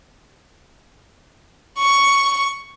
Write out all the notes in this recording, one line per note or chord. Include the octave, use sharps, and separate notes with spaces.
C#6